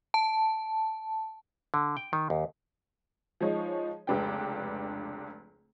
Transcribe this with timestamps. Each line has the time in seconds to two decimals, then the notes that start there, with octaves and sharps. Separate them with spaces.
0.14 A5
1.74 D3
1.97 G5
2.13 D#3
2.30 D#2
3.40 F3 G#3 D#4 C#5
4.07 F1 C#2 D4 B4 G5